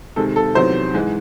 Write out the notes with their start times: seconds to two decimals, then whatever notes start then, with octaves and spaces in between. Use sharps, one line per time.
0.16 C3 D#3 G#3 A4
0.36 A4
0.55 E2 C3 D#3 F#3 A3 C5
0.94 G#2 E3 G#3